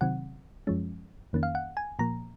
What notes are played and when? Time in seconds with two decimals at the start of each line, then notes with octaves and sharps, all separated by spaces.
0.01 C3 D#3 F#3 C4 F#5
0.67 F#2 F3 G#3 C#4
1.33 F2 D#3 A#3 C#4
1.43 F5
1.55 F#5
1.77 G#5
1.99 A#2 F3 A#3 A#5